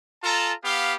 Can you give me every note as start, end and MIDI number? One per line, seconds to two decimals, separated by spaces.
0.23 0.52 65
0.23 0.52 69
0.23 0.52 81
0.23 0.52 82
0.64 0.94 59
0.64 0.94 67
0.64 0.94 77